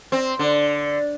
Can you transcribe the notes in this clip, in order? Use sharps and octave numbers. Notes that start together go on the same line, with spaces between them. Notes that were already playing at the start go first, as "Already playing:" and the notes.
C4
D3